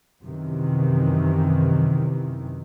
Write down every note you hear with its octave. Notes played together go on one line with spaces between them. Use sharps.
F#2 C3 D#3 E3